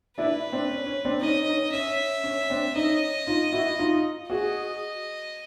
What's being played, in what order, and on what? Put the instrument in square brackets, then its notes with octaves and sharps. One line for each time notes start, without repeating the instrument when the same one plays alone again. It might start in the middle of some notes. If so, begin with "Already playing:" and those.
[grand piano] D4 E4 [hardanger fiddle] B4
[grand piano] C4 D4
C#4
C#4
C4 D4
[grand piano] C#4 D#4 [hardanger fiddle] D#5
[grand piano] C#4 D#4
[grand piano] C#4 [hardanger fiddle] E5
[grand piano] C#4
C4 D4
[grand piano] C#4 D#4 [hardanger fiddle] D#5
[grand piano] D#4 F4
E4 F#4
D#4 F4
[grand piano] F#4 G#4 [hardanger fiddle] D#5